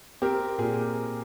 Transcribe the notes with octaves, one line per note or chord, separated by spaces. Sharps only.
C4 G4 A#4
A#2 G#4